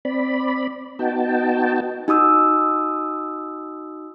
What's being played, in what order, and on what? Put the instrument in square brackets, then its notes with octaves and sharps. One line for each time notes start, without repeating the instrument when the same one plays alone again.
[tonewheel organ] C4 D5 B5
B3 D#4 F#4 G5 A5
[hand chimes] D#4 F#4 D#6 E6